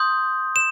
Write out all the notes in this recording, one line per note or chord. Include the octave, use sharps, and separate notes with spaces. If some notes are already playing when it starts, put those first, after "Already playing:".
Already playing: C6 D#6 G6
E7